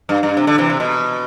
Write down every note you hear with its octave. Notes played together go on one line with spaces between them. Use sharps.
G2
G2
C3
D3
C3 E3
C3
B2